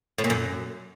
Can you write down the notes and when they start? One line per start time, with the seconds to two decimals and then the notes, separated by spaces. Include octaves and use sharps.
0.18 A2
0.24 A#2
0.30 F#2